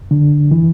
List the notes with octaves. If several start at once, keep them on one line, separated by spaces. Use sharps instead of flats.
D3
E3